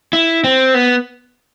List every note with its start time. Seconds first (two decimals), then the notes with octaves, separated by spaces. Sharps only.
0.13 E4
0.44 C4
0.74 B3